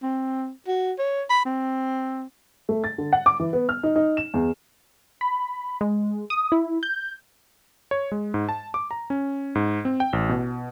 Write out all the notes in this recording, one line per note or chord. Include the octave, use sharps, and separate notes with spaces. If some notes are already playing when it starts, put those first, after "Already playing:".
C4
F#4
C#5
B5
C4
A3
A6
D3
F#5
D6
E3
B3
F6
D#4
D#4
E7
E2
B5
G#3
D#6
E4
G6
C#5
G#3
G#2
A5
D6
A#5
C#4
G#2
C4
G5
A1
B2